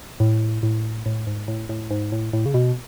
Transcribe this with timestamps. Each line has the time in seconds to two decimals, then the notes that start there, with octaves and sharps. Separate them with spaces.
0.20 A2
0.63 A2
1.06 A2
1.27 G#2
1.48 A2
1.69 A2
1.91 G#2
2.12 A2
2.33 A2
2.46 C#3
2.54 B2